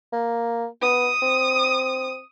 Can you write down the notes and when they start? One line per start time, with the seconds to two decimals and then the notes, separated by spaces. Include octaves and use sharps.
0.13 A#3
0.82 B3 D#6
1.22 C4